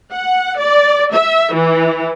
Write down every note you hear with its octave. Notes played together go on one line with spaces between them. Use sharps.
F#5
D5
E5
E3